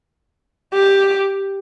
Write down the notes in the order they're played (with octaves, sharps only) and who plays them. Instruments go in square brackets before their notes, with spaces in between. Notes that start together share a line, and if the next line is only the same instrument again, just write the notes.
[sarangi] G4